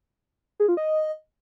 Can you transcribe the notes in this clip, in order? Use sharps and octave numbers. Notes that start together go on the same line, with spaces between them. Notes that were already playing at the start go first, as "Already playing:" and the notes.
G#4
F4
D#5